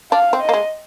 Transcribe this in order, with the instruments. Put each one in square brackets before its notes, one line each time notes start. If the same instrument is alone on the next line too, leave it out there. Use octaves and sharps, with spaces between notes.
[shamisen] D4 [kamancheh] F5
[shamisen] C4
[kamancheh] D#5
[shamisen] A#3
G#3